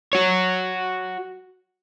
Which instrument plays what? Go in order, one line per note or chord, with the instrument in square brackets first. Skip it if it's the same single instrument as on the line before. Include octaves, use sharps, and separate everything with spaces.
[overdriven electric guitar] F#4 C#5